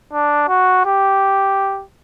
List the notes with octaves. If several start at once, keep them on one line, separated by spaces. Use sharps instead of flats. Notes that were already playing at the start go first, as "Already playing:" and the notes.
D4
F#4
G4